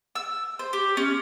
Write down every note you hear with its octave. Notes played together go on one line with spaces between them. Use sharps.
E6
C5
G4
C#4